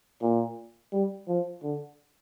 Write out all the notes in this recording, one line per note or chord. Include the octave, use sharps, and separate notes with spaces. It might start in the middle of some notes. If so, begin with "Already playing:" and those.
A#2
G3
F3
D3